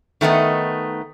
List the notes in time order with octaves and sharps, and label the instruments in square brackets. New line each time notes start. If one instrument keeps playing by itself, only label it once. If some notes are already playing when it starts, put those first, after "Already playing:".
[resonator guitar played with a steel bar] D#3 A3 B3 D#4